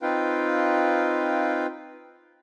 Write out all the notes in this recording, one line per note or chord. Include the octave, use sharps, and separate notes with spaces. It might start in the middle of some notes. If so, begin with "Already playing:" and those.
C4 D#4 F4 B4 F5 G5